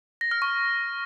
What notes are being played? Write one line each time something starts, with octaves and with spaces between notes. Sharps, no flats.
A#6
F6
C#6